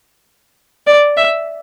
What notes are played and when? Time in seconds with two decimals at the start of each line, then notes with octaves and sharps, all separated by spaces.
0.87 D5
1.17 E5